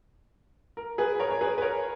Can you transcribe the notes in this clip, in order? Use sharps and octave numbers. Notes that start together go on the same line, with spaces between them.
A#4
G#4 B4
A#4 C#5
C#5
G#4 B4
B4
A#4 C#5